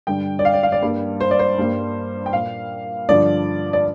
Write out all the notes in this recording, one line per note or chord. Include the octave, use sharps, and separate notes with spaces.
G2 D3 G3 G5
D5
F5
D5
F5
D5
G2 G3 A#3
C5
D5
C5
G2 G3 A#3
G5
A#2 A#3 F5
G2 D3 F3 D5
D5